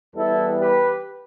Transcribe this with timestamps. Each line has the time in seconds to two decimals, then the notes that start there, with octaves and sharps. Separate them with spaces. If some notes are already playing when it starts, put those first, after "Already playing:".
0.16 E2 E3 G3 B3 E4 A4
0.59 G4 B4